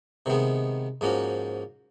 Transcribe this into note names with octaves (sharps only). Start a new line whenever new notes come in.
C3 D#3 G#3 B3
G#2 F3 A#3 C#4 F#4